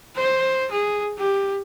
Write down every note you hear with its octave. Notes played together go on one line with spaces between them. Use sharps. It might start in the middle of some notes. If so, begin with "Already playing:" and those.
C5
G#4
G4